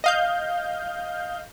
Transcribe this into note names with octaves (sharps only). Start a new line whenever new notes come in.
D#5 F5 G6